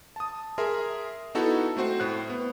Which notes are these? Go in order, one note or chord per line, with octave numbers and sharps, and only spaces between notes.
A5 D#6
G#4 A#4 E5 C6
B3 D#4 E4 F#4 A4
A3 C4 F#4 C5
A2 C5 F#6
B3